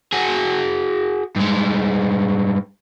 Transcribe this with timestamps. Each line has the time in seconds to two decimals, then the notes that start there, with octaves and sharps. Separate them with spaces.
0.13 F#4 G#4
1.36 G2 G#3